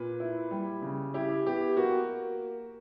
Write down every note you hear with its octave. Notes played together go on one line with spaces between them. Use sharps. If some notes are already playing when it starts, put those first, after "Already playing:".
Already playing: A#2 B4
E4
G3
C#3
E4 G4
B3 G4
A#3 F#4